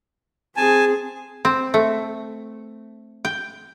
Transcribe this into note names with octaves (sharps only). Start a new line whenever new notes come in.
C4 G#4 G#5 A5
C4
A3
G5